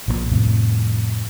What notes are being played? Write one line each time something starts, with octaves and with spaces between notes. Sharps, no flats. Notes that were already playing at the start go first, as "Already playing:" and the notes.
A#1 D3 A#3
F2 A2 C3